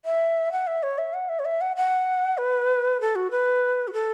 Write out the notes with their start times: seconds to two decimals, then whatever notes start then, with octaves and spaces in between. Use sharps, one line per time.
0.05 E5
0.52 F#5
0.67 E5
0.83 C#5
0.98 E5
1.14 F#5
1.29 E5
1.39 C#5
1.45 E5
1.61 F#5
1.76 F#5
2.38 B4
3.01 A4
3.16 F#4
3.31 B4
3.88 F#4
3.93 A4